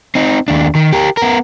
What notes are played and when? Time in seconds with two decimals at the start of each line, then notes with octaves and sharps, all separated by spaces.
0.15 C4 D#4
0.48 D#2 D4
0.75 D#3
0.92 G4 A#4
1.17 B3 A#4